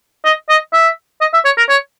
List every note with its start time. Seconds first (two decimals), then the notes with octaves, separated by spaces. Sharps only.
0.25 D#5
0.49 D#5
0.73 E5
1.21 D#5
1.33 E5
1.45 C#5
1.58 A#4
1.69 C#5